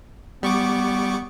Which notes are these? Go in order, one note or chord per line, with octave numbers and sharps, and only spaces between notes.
G3 B3 C#6 D6